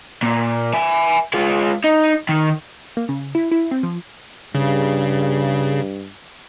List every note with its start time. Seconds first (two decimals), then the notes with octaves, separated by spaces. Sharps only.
0.23 A#2
0.74 E5 G#5
1.34 G#3 F4
1.84 D#4
2.29 D#3
2.97 A#3
3.09 C#3
3.35 E4
3.51 E4
3.71 C4
3.83 F3
4.55 G2 C#3